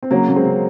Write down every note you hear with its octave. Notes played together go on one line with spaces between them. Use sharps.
C4
C#3 F#3 A#3
C#3 A#3
G#3 C4
C#3